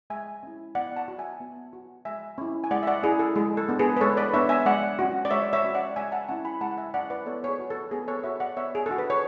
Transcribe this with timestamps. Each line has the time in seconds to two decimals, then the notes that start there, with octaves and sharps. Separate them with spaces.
0.10 G#3 E5 G#5
0.43 C#4 E4
0.75 B3 D5 F#5
0.96 F#5 A5
1.08 F#4
1.18 E5 G#5
1.40 B3
1.73 F#4
2.05 G#3 E5 G#5
2.38 C#4 E4
2.64 G#5
2.71 G#3 D5 F#5
2.83 E5
2.87 D5 F#5
3.03 C#4 E4 G#4
3.19 A4
3.36 G#3 G#4
3.57 A4
3.69 B3 D4
3.79 G#4 B4
3.97 B4
4.01 G#3 A4 C#5
4.17 B4 D5
4.33 B3 D4 C#5 E5
4.49 E5 G#5
4.66 G#3 D5 F#5
4.99 C#4 F#4
5.25 D5
5.31 G#3 C#5 E5
5.53 C#5 E5
5.64 C#4 F#4
5.75 D5 F#5
5.96 G#3 E5 G#5
6.12 F#5 A5
6.28 C#4 E4 F#5 A5
6.45 G#5 B5
6.61 G#3 F#5 A5
6.71 F#5
6.77 E5 G#5
6.94 C#4 E4 D5 F#5
7.10 B4 D5
7.26 B3 A4 C#5
7.44 C#5
7.48 G#4 B4
7.59 F#4
7.70 A4
7.91 B3 G#4 B4
8.08 A4 C#5
8.24 F#4 C#5 E5
8.40 D5 F#5
8.57 B3 C#5 E5
8.75 G#4
8.86 D4 F#4 A4
8.98 B4
9.10 C#5